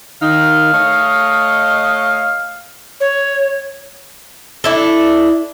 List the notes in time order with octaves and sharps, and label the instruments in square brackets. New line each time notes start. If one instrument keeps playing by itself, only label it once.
[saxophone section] D#3 D#4 [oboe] F5
[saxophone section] A3 C#5 D#5
[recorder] C#5
[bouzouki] D4 E4 A4